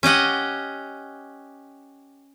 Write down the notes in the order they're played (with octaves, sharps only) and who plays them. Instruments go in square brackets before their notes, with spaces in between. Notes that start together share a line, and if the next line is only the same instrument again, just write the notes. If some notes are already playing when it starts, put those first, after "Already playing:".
[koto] C#4 G4 D#5 F#5